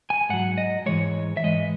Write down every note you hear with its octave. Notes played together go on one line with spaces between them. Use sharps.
G#5
G#2 F#3 F#5
D#5
G#2 E3 G#3 C#5
E5
G#2 E3 G#3 D#5